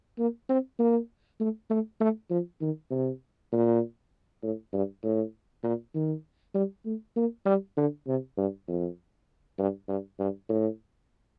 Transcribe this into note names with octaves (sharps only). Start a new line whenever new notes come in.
A#3
C4
A#3
A3
A3
A3
F3
D#3
C3
A#2
A2
G2
A2
A#2
D#3
G3
A3
A#3
G3
D3
C3
G2
F2
G2
G2
G2
A2